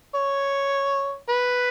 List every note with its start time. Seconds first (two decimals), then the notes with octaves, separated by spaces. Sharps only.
0.15 C#5
1.29 B4